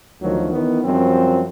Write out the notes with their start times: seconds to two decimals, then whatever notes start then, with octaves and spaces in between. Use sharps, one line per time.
0.21 D2 D#3 F3 F#3
0.52 D#3 E3 B3
0.85 F#2 F3 G3 C4